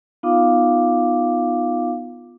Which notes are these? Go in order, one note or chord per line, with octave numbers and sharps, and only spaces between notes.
B3 D#4 F4 F5 D6